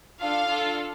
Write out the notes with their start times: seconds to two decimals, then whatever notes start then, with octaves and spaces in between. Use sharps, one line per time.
0.20 D4 F4 A4 F5
0.49 D4 F4 A4